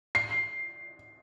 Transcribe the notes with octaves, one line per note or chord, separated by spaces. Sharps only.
C7